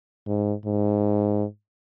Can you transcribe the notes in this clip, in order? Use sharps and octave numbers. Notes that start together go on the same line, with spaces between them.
G#2
G#2